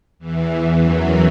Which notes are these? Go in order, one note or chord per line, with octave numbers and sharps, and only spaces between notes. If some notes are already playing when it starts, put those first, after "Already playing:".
E2 E3
F#2 F#3